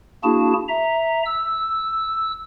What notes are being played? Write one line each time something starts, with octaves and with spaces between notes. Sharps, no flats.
A#3 D4 E4 F#4 G#4 A5
E5 A#5
E6